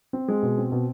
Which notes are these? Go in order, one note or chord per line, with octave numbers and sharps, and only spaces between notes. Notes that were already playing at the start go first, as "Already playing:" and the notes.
C4
G#3
B2
C4
B2